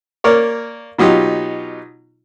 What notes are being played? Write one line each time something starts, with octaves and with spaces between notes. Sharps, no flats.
A#3 A#4 C#5 D5
B2 F#3 D#4 F4 G4